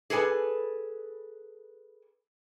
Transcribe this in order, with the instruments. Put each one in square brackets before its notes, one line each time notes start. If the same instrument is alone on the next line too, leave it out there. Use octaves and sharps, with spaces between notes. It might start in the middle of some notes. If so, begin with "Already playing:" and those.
[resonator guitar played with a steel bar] G#4 A4 B4 G#5